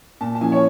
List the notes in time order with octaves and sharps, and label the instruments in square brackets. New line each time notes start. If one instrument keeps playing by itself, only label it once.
[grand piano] A#2 A5
A5
F3 A#3 C#4 E4 G#5
C#5